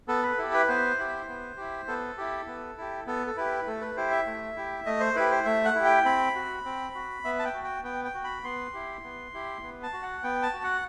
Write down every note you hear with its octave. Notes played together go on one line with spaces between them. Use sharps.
B3 A4
B4
E4 G4 A4
B4
B3 C5
E4 G4
B3
E4 G4
B3 A4
E4 G4
B3
E4 G4
B3 A4
A4
E4 G4 B4
A3 A4
B4
E4 G4 C5
E5
A3
E4 G4
A3 D#5
C5
E4 G4 B4
C5
A3 E5
F#5
E4 G4
G5
C4 B5
F#4
C4
F#4
B3 E5
A5
G5
F#4
G5
B3 G5
G5
F#4
B5
B3 C6
E4 G4
B3
E4 G4
B3
A5
F#4
F#5
B3 G5
A5
F#4
F#5